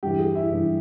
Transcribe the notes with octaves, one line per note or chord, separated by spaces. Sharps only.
G2 E3 G4
G#4
E4
G2 E3